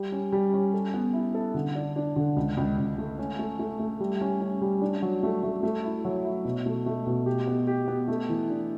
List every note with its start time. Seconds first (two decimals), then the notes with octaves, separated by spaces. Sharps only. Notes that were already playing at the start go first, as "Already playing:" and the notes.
Already playing: G3
0.12 C#4
0.32 G3
0.53 C#4
0.74 A4
0.94 B3
1.13 E4
1.35 A4
1.54 D3
1.75 D4
1.96 D4
2.16 D3
2.36 C#2
2.57 C#2
2.78 C#2
2.98 A3
3.18 C#4
3.39 A3
3.59 A3
3.79 A3
4.00 G3
4.21 C#4
4.41 C#4
4.61 G3
4.82 D4
5.02 F#3
5.23 A3
5.43 A3
5.63 A3
5.83 E4
6.05 F#3
6.25 E4
6.45 B2
6.66 A3
6.86 A3
7.06 B2
7.26 G4
7.47 B3
7.67 G4
7.88 B3
8.08 A3
8.29 E3
8.50 D4